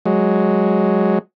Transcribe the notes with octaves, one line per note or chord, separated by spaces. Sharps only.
F#3 G#3